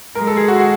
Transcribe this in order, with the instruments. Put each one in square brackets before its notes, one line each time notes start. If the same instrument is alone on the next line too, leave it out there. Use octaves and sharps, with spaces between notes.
[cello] G#3 [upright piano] A#4
[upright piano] A4
G#4
F#4
F#4